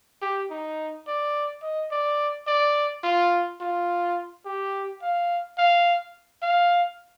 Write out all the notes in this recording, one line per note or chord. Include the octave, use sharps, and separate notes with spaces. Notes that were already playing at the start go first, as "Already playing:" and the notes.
G4
D#4
D5
D#5
D5
D5
F4
F4
G4
F5
F5
F5